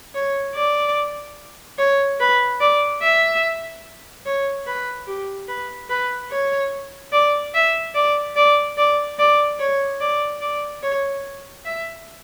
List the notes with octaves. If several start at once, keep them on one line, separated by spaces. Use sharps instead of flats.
C#5
D5
C#5
B4
D5
E5
C#5
B4
G4
B4
B4
C#5
D5
E5
D5
D5
D5
D5
C#5
D5
D5
C#5
E5